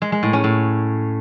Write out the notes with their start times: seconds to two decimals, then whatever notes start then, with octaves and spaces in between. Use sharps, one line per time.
0.02 G#3
0.12 G#3
0.23 A2
0.33 C#4
0.44 A2